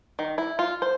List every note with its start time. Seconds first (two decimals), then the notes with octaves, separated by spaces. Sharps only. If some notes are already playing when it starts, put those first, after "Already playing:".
0.19 D#3
0.38 E4
0.59 F4
0.82 C5